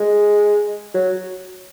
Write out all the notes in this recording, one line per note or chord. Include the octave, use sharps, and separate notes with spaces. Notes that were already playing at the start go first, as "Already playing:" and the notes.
Already playing: G#3
F#3